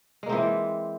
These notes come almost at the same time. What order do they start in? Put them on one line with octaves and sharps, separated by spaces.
G#3 A#3 C4 E3